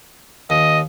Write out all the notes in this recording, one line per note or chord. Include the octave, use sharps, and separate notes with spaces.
D#2 D#5